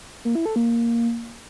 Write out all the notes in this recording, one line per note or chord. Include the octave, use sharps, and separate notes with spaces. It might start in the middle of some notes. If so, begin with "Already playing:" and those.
A#3
E4
A4
A#3